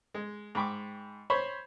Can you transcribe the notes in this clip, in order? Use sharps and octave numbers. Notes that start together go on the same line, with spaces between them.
G#3
G#2 G5 B5 C#6 D6
C5 C#5 B5 C#6